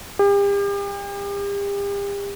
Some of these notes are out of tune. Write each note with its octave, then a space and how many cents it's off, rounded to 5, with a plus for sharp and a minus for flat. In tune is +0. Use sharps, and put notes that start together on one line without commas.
G4 +40